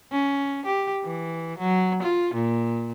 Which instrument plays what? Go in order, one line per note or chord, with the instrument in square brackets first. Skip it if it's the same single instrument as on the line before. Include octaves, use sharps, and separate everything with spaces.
[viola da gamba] C#4
G4
E3
F#3
F4
A#2